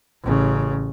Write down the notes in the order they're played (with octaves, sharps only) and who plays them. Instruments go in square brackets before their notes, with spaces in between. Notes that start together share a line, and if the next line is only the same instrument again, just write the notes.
[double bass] A1 C#3